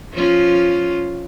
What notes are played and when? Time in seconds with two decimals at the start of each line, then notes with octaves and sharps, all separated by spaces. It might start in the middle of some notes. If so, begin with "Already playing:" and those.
0.12 F3 C#4 F4